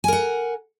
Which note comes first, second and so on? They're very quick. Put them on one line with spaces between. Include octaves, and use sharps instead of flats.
G#5 A#4 F#5